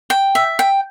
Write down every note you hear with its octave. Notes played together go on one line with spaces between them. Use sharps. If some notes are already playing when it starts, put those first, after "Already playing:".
G5
E5
G5